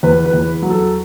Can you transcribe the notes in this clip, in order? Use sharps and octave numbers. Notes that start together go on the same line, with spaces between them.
E2 B4
B4
E2
F#3
A4